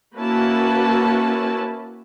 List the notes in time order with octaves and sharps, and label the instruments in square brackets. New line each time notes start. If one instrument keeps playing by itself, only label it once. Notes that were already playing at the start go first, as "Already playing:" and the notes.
[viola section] A#3 C#4 E4 F#4 B4 A5